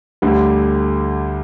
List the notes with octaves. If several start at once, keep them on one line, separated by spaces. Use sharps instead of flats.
D2 D3 G3